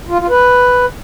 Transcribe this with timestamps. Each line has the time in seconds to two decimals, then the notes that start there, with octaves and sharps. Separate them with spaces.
0.09 F4
0.19 F4
0.30 B4